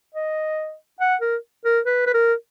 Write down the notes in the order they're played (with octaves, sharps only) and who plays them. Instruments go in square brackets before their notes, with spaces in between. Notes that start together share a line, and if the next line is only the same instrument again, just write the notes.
[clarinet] D#5
F#5
A#4
A#4
B4
B4
A#4